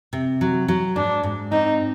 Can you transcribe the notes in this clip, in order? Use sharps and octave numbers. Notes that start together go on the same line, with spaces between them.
C3
F#3
F#3
G#2 D4
G#2
C4 D#4